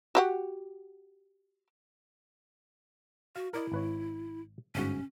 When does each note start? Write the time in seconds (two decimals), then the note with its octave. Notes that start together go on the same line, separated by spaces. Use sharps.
0.15 F#4 G4 F#5
3.36 F#4 F5
3.53 E4 A#4 D5 D#5
3.72 G#1 B4 C#5
4.75 G1 G#2 C#4 F#4